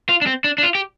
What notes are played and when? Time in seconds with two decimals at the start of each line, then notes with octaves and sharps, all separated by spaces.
0.09 F4
0.22 D4
0.26 C4
0.44 D4
0.58 D4
0.63 F4
0.75 G4